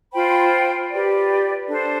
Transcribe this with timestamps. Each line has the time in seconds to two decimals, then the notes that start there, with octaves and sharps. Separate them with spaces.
0.13 F4 C5 G5 B5
0.91 G4 B4 D5
1.68 D4 A4 C5